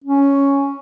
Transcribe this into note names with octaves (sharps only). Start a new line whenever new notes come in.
C#4